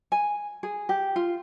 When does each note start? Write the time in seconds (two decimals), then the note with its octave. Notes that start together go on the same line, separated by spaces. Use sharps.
0.12 G#5
0.63 G#4
0.89 G4
1.16 F4